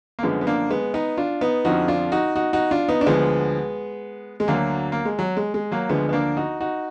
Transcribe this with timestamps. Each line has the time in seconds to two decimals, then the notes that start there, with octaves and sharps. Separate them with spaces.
0.19 A#3
0.23 F#2 D3 F3 G#3 B3
0.41 B3
0.47 A#3 D4
0.70 G#3 B3
0.94 B3 D#4
1.17 D4 F4
1.41 B3 D#4
1.65 F2 D3 F3 D#4 F#4
1.88 D4 F4
2.12 D#4 F#4
2.36 D#4 F#4
2.53 D#4 F#4
2.71 D4 F4
2.89 B3 D#4
3.01 D4
3.06 D2 D3 F3 G#3 B3
4.40 G#3
4.48 D2 D3 F#3 A#3
4.92 A#3
5.05 G#3
5.19 F#3
5.37 G#3
5.54 G#3
5.72 F#3 A#3
5.89 D2 D3 F3 G#3 B3
6.09 B3
6.13 A#3 D4
6.37 D#4 F#4
6.60 D#4 F#4